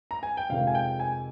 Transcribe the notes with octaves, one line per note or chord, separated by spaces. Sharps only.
A#5
G#5
G5
F2 C3 D#3 G#3 F5
G#5
G5
G#5